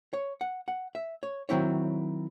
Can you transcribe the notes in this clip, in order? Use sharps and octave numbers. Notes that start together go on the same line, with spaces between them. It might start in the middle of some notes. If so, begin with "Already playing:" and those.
C#5
F#5
F#5
E5
C#5
D#3 F#3 C4 E4 C#5